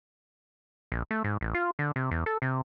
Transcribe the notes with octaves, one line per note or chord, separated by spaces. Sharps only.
A#1
A3
G#2
A1
F4
D3
C3
E2
A4
C3